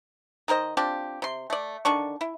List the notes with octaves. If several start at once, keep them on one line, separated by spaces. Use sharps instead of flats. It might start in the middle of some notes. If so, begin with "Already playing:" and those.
D#3 A#4 C5 D#5
C4 D4 F4 G4
C3 C6
A3 D5
D3 D#3 D4 C#6
E4